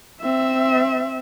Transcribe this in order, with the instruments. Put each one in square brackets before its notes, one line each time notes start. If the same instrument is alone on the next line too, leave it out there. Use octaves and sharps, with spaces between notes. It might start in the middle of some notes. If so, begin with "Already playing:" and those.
[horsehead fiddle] C4 E5